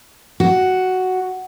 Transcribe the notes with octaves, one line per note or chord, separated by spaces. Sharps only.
F#4